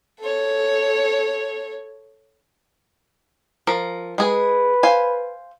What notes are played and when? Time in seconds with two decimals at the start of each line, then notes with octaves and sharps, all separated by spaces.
0.20 A4 C#5
3.67 F3 A#4
4.18 G#3 G#4 B4
4.83 C5 F5 G#5